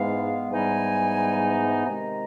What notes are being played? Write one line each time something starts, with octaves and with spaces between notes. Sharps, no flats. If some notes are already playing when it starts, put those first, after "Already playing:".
Already playing: G#2 E3 G#3 B3 F5
G#2 E3 G3 B3 D#4 G#5
C3 D#3 G#3 A#5